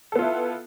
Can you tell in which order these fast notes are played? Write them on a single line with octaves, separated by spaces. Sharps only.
A4 B3 F4 E4